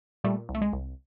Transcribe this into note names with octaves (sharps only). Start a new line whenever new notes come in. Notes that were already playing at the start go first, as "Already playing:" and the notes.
A#2 G3 A3
C2
A3
G#3
C2